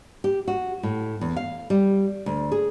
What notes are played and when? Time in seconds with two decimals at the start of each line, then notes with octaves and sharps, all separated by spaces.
0.24 G4
0.48 F#4
0.83 A2
1.21 E2
1.36 F5
1.70 G3
2.26 D2
2.52 G#4